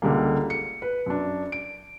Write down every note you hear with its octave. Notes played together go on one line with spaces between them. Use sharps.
C#2 D3 G3 A#3
C#7
B4
F#2 D4
D7